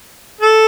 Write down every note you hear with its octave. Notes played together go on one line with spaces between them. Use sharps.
A4